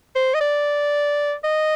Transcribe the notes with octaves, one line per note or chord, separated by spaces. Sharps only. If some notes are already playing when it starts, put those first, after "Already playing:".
C5
D#5
D5
D#5